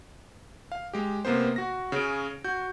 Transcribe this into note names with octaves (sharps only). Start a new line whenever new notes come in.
F5
G#3 G4
C3 A#3 B3 C5
F#4 A#6
C#3 C#4 G#4 D7
F#4 G6